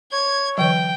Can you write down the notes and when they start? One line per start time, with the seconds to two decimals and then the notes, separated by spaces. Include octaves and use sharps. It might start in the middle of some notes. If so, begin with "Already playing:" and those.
0.12 C#5 G#6
0.58 D3 E3 F#3 G5